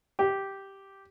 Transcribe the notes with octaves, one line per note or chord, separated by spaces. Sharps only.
G4